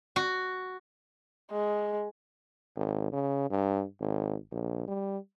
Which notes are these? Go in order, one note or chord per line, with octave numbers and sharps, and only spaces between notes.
F#4
G#3
G#1
C#3
G2
G#1
A#1
G3